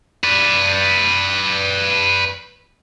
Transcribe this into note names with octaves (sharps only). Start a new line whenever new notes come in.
B4 D5